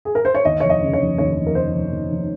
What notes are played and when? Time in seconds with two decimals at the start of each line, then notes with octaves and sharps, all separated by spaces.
0.05 G#4
0.15 A#4
0.25 C5
0.35 C#5
0.45 D#2 D#5
0.60 F1 C#5
0.70 D#5
0.82 C#3
0.93 C#5
0.99 F1
1.18 D#2 C#5
1.36 F1
1.46 A#4
1.55 C#3 C5
1.73 F1
1.91 D#2
2.09 F1